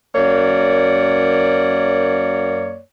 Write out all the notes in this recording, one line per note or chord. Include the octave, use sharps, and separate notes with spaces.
F#2 A#3 C#5 D5